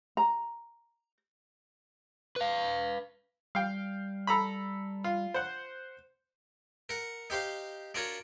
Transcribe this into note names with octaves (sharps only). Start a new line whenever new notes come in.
A#5
B4 F5
G3 F5 G5
A4 A#5 B5
F4
C5 F#5
A#4 F#5
D#4 G4 C5 F5
D4 F4 F#4 A#4 C#5